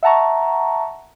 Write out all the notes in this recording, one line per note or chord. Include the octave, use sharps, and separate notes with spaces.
E5 F#5 A5 A#5 C#6